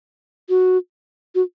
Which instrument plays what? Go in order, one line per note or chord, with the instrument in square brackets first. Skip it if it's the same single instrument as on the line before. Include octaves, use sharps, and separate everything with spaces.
[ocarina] F#4
F#4